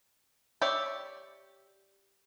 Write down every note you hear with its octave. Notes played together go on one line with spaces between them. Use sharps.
G4 C#5 D5 E5 G5